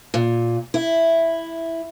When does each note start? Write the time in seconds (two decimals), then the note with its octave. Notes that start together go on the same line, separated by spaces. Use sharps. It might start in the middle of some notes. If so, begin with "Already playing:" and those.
0.14 A#2
0.74 E4